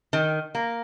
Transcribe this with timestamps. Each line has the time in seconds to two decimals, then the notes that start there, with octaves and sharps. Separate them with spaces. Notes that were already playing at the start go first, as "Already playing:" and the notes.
0.13 D#3
0.55 A#3